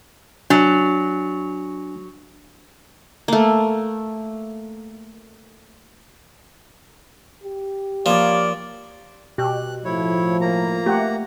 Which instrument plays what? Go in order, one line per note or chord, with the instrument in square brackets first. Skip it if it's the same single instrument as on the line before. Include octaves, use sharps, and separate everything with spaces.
[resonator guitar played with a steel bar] F#3 [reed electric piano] D4 G#5 A6
[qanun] A3 A#3
[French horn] G4
[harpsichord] F3 [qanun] A#3 C#5 [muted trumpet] D5
[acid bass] B2 [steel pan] G4 [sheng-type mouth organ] F#6
[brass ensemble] A2 F3 [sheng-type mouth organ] E4 C#5
[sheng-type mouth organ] A#3 A#5
[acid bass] A3 [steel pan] G4 F#5